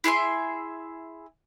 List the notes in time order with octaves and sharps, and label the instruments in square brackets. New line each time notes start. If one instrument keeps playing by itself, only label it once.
[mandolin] E4 G#4 E5 C6